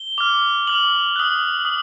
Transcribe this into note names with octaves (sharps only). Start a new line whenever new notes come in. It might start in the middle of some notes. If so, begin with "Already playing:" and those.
Already playing: G7
D6 F6
D6 F6 F#7
D#6 F#6
D#6